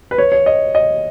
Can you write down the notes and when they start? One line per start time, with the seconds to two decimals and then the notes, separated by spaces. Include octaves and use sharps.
0.11 B4
0.18 C#5
0.32 C#5
0.46 D#5
0.75 D#5